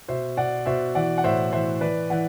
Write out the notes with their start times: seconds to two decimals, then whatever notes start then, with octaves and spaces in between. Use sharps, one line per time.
0.08 B2 C5 E5
0.37 B2 D5 F#5
0.66 B2 C5 E5
0.95 E3 D5 F#5
1.18 F#5
1.24 A2 C5 E5
1.53 E3 C5 E5
1.81 E3 B4 D5
2.10 E3 D5 F#5